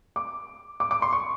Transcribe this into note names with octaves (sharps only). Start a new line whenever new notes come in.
D6
D6
D6
C6
C#6